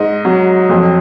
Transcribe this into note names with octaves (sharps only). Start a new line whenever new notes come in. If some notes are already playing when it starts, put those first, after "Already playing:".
Already playing: G#2 D#5
F#3
F2